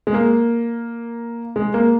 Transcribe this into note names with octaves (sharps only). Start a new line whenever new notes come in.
G#3
A#3
G#3
A#3